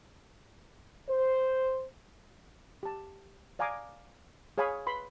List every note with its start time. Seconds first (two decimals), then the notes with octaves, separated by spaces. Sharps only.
1.09 C5
2.83 G4 A5
3.59 D5 F5 G#5 A#5 D6 D#6
4.58 G#4 C#5 F5 G#5 B5 D#6
4.87 B4 B5 C6